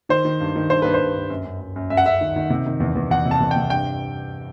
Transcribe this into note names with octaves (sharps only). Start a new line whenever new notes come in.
D#3 C5
D#3
G2
D#3
G2 C5
G2 B4
C5
G2
G2
F#2
F#2
F#2
F#2
F#2 E5
F#5
F#2 E5
D#3
D#3
C3
D#3
E2
E2
E2 F#5
C3
A5
E2
G5
C3
G2 G5